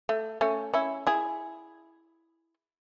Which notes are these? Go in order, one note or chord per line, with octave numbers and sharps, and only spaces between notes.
A3
A3 C#4
C#4 E4
E4 G#4